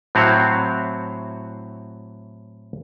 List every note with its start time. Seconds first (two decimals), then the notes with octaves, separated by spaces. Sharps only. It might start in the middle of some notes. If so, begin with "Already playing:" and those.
0.15 A2 F#3 C4 E4 F#4 F5